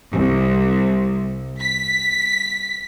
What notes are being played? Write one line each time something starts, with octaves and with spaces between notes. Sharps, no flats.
C2
B6